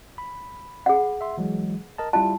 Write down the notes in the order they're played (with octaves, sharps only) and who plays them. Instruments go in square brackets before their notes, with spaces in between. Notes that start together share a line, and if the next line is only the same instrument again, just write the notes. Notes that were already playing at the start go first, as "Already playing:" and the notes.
[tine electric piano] B5
[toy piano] G#4 F#5
[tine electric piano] E5 C6
E3 F#3 G#3
A#4 D#5 A5
[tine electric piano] G3 E4 F4 [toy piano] A5